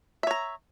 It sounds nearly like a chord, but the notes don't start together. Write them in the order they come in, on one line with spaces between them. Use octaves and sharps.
E5 C#5 A#5